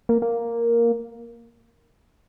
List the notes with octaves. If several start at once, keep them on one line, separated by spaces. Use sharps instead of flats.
A#3
A#3